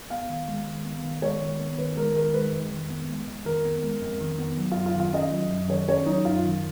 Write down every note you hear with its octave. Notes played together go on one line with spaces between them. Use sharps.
B3 F5
D#3
G#3
D#3
B3
D#3
G#3 C#5
D#3
B3
D#3 B4
G#3 A#4
D#3 A#4
G#3 B4
F2
D#3
B3
G#3
F2
D#3 A#4
B3
G#3
F2
D#3
B3
F#3
F#2 F4
F4
D#3
F4
C#4 D#5
F#3
F#2
D#3 C#5
C#4 C#5
F#3 D#4
F#2 F4
D#3